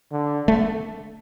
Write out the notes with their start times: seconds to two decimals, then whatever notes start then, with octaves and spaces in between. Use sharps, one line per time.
0.12 D3
0.48 A3